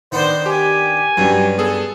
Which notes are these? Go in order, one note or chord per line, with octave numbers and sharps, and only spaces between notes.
D#3 B3 D4 C5
G4 G#5
G2 F#3 G3 C#4
B3 G#4 A4